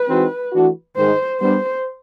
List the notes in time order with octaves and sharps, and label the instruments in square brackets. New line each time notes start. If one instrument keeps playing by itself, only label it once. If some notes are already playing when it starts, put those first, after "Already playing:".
Already playing: [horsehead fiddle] B4
[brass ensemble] E3 G#3 C4 D#4 F#4
E3 A3 D4 F#4
[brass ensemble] G#2 D#3 G#3 [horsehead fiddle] C5
[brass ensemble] G3 B3 D4 [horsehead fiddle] C5